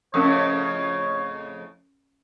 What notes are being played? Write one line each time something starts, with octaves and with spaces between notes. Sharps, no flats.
F2 A2 C#3 C#4 A#4 C#5 D#6